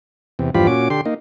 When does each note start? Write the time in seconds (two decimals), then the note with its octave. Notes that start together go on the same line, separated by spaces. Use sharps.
0.39 E2 C3
0.55 E2 G2 F3 F4 G4 B5
0.67 A#2 C#4 F#4 D6
0.90 D3 G4 C6
1.05 A#3 D#4